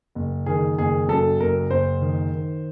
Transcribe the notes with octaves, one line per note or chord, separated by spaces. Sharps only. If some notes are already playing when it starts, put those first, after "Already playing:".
F#1
D#3 G#4
F#1 G#4
F#2 A4
F#1 A#4
F#1 C5
D#3
D#3